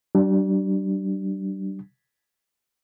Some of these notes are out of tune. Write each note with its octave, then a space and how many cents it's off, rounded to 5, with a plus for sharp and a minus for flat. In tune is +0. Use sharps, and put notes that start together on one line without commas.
G3 -35 D4 +0